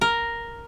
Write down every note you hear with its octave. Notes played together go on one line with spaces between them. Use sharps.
A#4